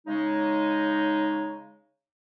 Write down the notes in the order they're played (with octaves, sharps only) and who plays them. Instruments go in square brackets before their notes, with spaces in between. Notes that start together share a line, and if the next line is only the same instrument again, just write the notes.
[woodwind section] C#3 G#3 D#4